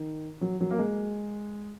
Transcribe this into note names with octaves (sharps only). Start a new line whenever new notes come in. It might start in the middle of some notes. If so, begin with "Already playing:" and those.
Already playing: D#3
F#3
F#3
A#3
G#3